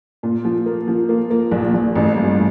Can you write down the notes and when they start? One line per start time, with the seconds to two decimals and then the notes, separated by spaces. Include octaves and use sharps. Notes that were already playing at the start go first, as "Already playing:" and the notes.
0.23 A#2
0.45 F3
0.66 A#3
0.88 F3
1.09 A#3
1.30 A#3
1.51 A#1
1.73 A#1
1.95 A1
2.17 G2